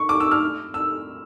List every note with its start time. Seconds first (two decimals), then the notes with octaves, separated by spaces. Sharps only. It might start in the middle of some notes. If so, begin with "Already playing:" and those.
Already playing: C#6
0.09 D6
0.20 E6
0.31 F6
0.74 E6